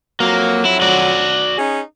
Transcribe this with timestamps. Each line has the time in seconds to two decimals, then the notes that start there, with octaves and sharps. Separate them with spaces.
0.20 F2 F#3 A#3
0.65 E4
0.82 F#4 D5
1.58 C#4 D#4 G#4